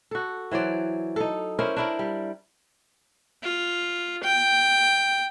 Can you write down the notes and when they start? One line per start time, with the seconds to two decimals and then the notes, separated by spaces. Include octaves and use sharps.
0.11 F#4 A4
0.51 E3 F#3 C5 D5
1.16 D#4 A4
1.59 C#4 E4 A#4 C5
1.76 D4 E4 A#4
1.99 G3
3.43 F4
4.23 G5